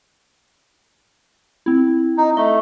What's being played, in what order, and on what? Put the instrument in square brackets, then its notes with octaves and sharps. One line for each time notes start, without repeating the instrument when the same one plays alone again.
[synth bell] C4 E4
[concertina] D#4
[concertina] A3 [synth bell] D#5